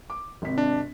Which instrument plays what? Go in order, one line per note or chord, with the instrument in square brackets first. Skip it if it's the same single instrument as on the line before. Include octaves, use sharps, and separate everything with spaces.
[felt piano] D6
G#1 C3 B6
[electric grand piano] D4